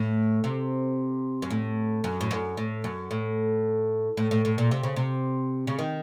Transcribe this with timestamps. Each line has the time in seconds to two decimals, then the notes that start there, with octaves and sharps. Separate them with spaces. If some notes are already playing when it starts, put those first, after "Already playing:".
Already playing: A2
0.44 C3
1.42 F#2
1.50 A2
2.04 F#2
2.21 A2
2.31 F#2
2.57 A2
2.84 F#2
3.11 A2
4.17 A2
4.31 A2
4.45 A2
4.58 A#2
4.71 C3
4.83 C#3
4.96 C3
5.67 C#3
5.79 D#3